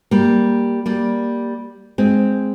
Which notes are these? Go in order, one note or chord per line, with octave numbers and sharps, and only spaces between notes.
G3 A#3
G3 A#3
G#3 C4